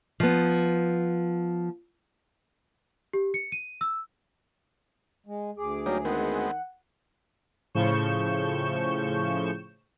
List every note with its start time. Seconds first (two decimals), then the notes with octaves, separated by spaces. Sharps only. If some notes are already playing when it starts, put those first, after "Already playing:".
0.20 F3 B3
3.13 G4
3.34 C#7
3.52 D#7
3.81 E6
5.26 G#3
5.57 D2 G#4 D6
5.86 F#3 G3 A#3 D#4
6.05 D#3 G#3 B3 C4 F#5
7.75 A2 C#3 F3 C#6 G6 E7